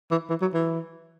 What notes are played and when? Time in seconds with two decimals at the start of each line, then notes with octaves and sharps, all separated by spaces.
0.11 E3
0.29 E3
0.41 F#3
0.54 E3